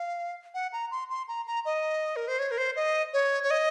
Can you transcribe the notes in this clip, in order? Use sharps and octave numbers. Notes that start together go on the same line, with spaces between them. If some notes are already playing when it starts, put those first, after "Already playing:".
Already playing: F5
F#5
A#5
C6
C6
A#5
A#5
D#5
A#4
C5
C#5
A#4
C5
D#5
C#5
C#5
D#5